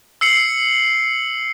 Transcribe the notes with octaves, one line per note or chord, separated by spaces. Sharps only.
E6 C7 C#7 F#7